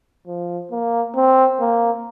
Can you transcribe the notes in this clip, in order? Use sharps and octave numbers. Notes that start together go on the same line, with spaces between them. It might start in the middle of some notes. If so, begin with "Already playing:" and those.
F3
A#3
C4
A#3